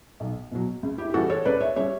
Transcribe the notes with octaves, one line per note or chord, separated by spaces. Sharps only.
B1
B2 F#3
C#2
E4 G4
G4
C#3 E3 G3 F#4 A4
A4 C#5
C#2 B4 D5
C#5 E5
C#3 G3 C#5 E5